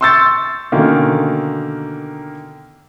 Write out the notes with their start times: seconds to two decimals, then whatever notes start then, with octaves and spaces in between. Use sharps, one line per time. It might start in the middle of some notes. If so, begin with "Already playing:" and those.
0.01 C6 C#6 E6 G6 A6 C#7
0.72 B2 D3 D#3 A#3 C#4